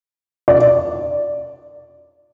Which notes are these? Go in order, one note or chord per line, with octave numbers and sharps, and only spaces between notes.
D5